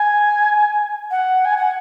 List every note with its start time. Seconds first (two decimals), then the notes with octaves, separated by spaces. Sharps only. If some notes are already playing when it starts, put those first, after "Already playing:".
Already playing: G#5
1.10 F#5
1.44 G#5
1.57 F#5